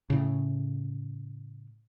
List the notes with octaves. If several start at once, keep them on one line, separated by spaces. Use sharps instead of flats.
A2 C#3